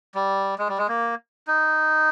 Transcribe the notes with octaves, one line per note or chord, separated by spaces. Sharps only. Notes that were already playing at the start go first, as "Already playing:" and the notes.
G3
G#3
G3
G#3
A#3
D#4